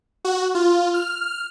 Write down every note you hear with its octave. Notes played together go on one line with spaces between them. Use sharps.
F#4
F4
F6